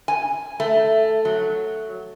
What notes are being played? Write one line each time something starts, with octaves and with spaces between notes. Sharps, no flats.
G#5
A3
F#3